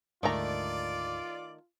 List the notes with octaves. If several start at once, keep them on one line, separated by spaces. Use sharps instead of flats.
D2 G#2 D#3 A3 F4 D5 A#5